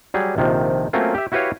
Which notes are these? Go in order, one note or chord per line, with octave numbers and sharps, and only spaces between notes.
F#3 G3 G#4
A#1 C3 D#3 F3
F#3 A3 A#3 C4 C#4 F4
G4 E5
E4 F#4 G4 B4 C#5 F5